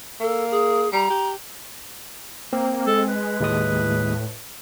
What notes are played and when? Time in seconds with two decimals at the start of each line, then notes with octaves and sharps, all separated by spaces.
0.20 A#3 A4
0.50 G#4
0.92 G3 A#5
1.10 G4
2.53 A#3 C4
2.87 G#3 A4
3.09 B4
3.40 D#2 A2 G#3 D#6